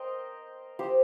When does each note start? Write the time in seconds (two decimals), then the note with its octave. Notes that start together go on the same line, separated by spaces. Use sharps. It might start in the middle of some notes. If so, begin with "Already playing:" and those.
Already playing: A#4 C5 D#5 G5
0.79 G4 C5